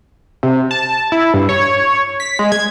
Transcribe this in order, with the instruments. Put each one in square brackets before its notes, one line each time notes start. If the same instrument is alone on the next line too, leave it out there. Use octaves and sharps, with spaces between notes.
[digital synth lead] C3
A5
E4
G2
C#5
B6
G#3
G#6